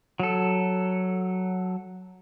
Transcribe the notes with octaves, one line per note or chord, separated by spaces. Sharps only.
F#3 A4